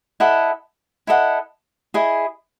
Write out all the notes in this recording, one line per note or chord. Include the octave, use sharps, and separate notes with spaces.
E4 A4 D#5 F#5
E4 A4 D#5 F#5
E4 G#4 D#5